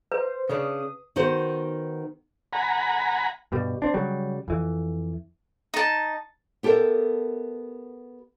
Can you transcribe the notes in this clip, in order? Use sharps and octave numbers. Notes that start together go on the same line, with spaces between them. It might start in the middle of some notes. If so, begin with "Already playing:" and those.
B4 C5
C#3 C#4 D4 D#6
D#3 B3 F#4 C5
F#5 G#5 A#5 B5
G2 B2 G3
C4 D4
C#3 F#3 G3
F2 E3
D#4 A5
B3 G4 A4 A#4 E5